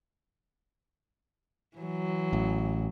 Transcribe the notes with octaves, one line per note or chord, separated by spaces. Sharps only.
E3 F#3
A1